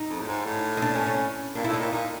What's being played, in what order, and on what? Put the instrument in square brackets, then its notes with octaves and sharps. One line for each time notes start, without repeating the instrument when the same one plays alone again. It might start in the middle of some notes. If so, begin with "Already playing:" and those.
Already playing: [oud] D#4
[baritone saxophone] F2
A2
G#2
A2
[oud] D#4
D4
C#4
C#4
[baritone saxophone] A#2 [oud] D4
[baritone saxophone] A2 [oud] E4
[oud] D#4
[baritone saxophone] A#2
[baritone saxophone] A#2 [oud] D#4